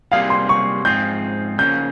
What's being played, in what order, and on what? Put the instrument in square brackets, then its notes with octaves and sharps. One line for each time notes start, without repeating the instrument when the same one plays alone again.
[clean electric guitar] C3 G3 A#3 F4 G#4 [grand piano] F5
[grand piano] C6
C#6
[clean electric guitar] G#2 F3 C4 F4 G#4 [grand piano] G6
[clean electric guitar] C#3 F3 A#3 C#4 [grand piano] G6